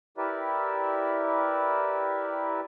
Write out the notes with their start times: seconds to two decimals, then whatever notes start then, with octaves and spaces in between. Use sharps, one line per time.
0.18 E4 G4 A#4 B4 D5 E5